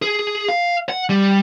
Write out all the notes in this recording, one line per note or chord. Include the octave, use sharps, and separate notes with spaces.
G#4
F5
F#5
G3